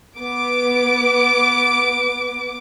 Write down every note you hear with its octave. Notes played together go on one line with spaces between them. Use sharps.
B3 D6 D7